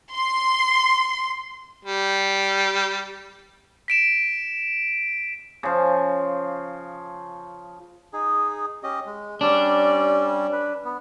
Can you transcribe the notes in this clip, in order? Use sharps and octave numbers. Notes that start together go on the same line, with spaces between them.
C6
G3
B6 D7 E7
C#3 F3
D#4 G#4
C#4 G4 D#5
G#3
G3 C#4 D4
B4
B3